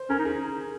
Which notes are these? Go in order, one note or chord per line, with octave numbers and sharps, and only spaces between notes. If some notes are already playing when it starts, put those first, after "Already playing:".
Already playing: C5
C#4 A#4
D#4
G#4